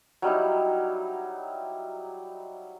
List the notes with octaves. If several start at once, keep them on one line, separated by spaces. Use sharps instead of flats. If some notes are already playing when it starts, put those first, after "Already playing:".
F#3 G3 D#4 E4